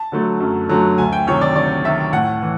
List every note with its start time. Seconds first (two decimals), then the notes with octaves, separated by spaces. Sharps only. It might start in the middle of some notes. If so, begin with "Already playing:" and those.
Already playing: A5
0.12 D3 F#3 A3
0.40 F#2
0.69 D3 F#3 A3
0.98 D2 G#5
1.13 G5
1.27 C3 D#3 C#5
1.41 D5
1.55 D2 D5
1.84 C3 D#3 E5
2.13 A2 F#5
2.42 E3